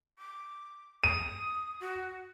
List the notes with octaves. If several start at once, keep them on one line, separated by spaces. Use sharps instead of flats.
D6
D#6 D#7
F#4